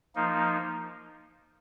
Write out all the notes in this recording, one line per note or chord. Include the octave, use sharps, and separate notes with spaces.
F3 A#3 D#4